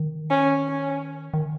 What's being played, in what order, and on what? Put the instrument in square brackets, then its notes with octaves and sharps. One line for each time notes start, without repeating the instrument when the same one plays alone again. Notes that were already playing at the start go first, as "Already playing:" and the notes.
Already playing: [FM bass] D#3
[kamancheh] C#4
C#4
[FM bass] D#3